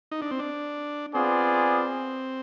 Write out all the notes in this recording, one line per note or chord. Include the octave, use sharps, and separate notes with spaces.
D#4
D4
C4
D4
B3 C4 F4 G#4 D5